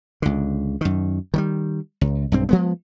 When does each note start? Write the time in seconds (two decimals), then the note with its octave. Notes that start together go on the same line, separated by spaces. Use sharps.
0.22 C#2 D3
0.81 F#2 D#3
1.34 D#3 F#3 G3
2.01 C#2
2.32 B1 G2 C4
2.49 F3 G#3 B3